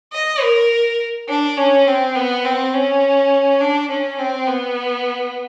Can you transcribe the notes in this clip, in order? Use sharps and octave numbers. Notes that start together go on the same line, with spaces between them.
D#5
A#4
D4
C#4
C4
B3
C4
C#4
D4
C#4
C4
B3